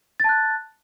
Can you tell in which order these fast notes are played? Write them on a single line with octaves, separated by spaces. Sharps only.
A6 A5 F#6